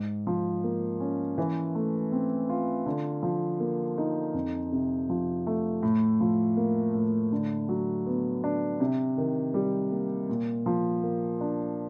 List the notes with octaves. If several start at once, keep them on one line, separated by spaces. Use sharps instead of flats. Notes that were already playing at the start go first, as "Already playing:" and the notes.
Already playing: G#2
F3
A#3
C#4
E3
A3
C4
F4
D3
F3
A#3
D#4
F2
C3
F3
A3
A2
F3
A#3
A2
D3
F#3
B3
D4
C3
D#3
G3
A#3
A#2
F3
A#3
D4